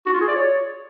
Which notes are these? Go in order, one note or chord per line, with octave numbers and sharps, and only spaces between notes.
F#4
F4
G#4
D5
C#5